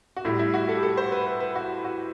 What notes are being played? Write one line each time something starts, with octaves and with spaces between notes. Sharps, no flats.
F#4
A2 G3 E4
E4
F#4
A4
G4
A4
C5
B4
B4
B4
F#4
F#4